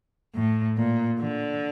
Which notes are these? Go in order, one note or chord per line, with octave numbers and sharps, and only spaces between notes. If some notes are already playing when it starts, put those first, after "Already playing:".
A2
A#2
D3